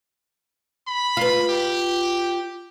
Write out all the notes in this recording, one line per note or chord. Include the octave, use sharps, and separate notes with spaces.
B5
F4 B4
G4